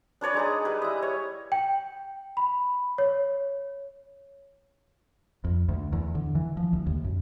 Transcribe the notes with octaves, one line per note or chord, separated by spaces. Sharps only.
D4 B4 C#5 D5
G#3 D#4 G#4
G3 B4
E4 D#5
C#5
G5
B5
C#5
F2
D2
E2
D3
E3
F3
D2
D#2
F#2